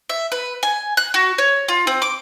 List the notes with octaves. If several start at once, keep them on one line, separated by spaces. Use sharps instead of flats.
E5
B4
G#5
F#6
F#4
C#5
F4
C4
D6